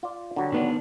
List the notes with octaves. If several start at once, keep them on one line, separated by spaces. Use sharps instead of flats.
F4 D5
D3 F#3 G3
D#3 B3 D4